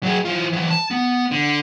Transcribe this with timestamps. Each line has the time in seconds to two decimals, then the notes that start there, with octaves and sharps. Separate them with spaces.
0.03 F#3 G#4
0.25 E3 F4
0.52 E3 F#3
0.70 A5
0.91 B3
1.31 D3